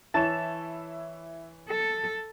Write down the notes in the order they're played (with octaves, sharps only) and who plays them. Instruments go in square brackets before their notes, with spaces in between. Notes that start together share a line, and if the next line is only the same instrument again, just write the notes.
[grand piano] E3 C#5 [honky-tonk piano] E4 E7 [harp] A5
[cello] A4